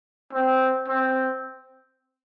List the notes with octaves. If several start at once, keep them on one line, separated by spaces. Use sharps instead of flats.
C4
C4